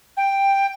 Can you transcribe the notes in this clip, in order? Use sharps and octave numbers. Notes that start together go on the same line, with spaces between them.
G5